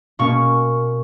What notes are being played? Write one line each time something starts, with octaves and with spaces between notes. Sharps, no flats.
B2 A#3 C#4 C#6